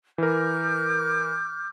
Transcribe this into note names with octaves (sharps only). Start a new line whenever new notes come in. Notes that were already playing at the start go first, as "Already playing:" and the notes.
E3 A#4 D6 F6 G6